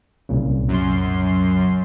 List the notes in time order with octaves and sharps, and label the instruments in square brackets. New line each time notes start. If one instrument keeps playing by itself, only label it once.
[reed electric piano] C2 A#2 C#3
[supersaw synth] F#2 C6